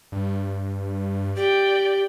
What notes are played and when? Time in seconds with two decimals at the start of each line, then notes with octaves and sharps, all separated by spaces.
0.12 G2
1.36 G4 D5 G5